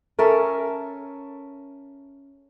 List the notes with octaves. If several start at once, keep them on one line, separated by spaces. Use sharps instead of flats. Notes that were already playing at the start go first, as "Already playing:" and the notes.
C#4 A4 A#4 E5